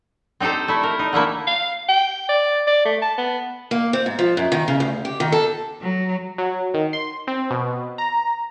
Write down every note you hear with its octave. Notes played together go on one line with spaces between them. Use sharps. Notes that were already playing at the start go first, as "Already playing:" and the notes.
C4 D#4 G4 A4 C5
A3 E4
A#4
D#4
D3 A3 A#3 E4
F5
G5
D5
D5
A3
A5
B3
A#3
C4
G#2
F3
F#2
D#3
C#3
D2
G4
D#3
A4
F#3
F#3
D#3
C6
C4
B2
A#5